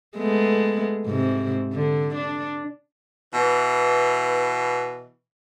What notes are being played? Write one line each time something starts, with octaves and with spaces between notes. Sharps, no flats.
G#3 A3 B3
G#2 C3
D3
D4
B2 E3